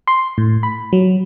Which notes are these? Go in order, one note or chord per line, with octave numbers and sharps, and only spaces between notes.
C6
A2
B5
F#3